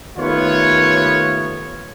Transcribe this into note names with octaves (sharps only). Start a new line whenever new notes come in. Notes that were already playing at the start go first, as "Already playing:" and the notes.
D#2 A3 B3 F4 C#5